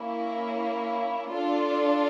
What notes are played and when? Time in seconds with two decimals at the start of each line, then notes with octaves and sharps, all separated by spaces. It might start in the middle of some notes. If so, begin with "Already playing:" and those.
Already playing: A#3 C#4 E4
1.31 D4 F4 A4